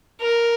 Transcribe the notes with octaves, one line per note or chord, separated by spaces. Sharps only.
A#4